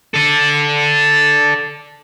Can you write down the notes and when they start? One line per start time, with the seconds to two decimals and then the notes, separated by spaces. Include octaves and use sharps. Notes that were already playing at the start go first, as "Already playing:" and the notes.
0.14 A4 D5